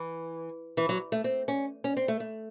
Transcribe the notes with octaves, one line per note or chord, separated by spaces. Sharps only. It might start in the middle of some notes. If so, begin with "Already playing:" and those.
Already playing: E3
E3
F#3
A3
C4
C#4
C#4
C4
A3
A3